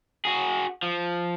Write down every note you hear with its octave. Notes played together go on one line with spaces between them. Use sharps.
F#4 G#4
F3